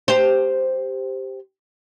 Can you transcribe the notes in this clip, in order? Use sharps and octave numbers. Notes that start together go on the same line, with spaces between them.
G4 C5